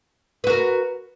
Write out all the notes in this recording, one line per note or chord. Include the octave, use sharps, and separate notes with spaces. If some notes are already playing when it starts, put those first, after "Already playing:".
F#4 A#4 B4